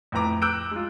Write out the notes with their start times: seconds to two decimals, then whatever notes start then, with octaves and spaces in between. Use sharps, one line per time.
0.12 F2 A2 B4 A#5 D6
0.42 D6 E6 F#6 G6 D7
0.71 G#3 F4